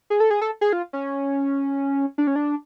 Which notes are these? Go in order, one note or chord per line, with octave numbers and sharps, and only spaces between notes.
G#4
A4
G#4
A4
G#4
F4
C#4
D4
C#4
D4